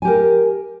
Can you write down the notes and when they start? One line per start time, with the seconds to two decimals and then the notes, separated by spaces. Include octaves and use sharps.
0.02 G#5
0.05 G4
0.08 A#4